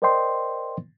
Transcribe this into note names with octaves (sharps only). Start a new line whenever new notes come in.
A#4 C5 D5 D#5 G5 C6